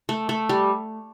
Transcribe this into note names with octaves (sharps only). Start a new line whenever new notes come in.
A3
A3
G3